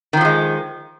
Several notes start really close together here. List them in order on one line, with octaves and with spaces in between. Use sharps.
D#3 F3 F#3 G#3